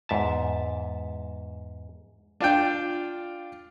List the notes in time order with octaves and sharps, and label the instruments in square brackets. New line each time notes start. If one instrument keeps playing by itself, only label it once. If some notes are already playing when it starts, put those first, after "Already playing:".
[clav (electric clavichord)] E2 G#2 E5 A5
[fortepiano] D4 F4 D5 G5